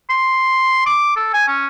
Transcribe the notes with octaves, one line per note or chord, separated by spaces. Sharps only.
C6
D6
A4
G#5
C#4